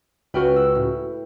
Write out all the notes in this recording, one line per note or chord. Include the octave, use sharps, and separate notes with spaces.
C#2 F#4 B4 G5 F6
E6
A2